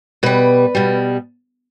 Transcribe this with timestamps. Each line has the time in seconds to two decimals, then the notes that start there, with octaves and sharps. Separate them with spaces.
0.23 B2 G3 B4
0.75 B2 G3